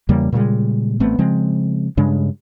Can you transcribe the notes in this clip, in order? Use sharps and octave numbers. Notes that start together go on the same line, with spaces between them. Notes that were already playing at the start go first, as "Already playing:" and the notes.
E2 C#3 G3 A#3
A#2 C#3 G3 G#3
A1 A3 B3 C4
C#3 F3 G#3 C4
G2 C#3 G#3 D4